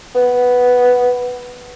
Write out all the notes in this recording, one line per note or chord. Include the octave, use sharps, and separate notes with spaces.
B3